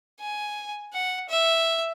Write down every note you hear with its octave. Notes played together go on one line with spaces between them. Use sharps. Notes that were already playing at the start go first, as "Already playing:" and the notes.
G#5
F#5
E5